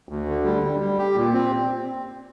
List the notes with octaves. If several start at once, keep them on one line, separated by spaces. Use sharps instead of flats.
D2
D3
G3
G3
G3
G4
A#2
C4